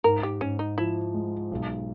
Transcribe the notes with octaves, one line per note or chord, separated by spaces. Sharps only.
G#2 A#4
G4
G#2 C#4
D#4
F3 E4
G#3
B1